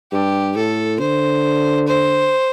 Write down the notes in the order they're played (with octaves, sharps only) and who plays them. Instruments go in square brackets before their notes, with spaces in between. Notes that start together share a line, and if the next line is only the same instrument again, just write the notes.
[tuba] G2 [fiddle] G4
[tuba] A2 [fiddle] A4
[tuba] D3 [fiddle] C5
[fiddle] C5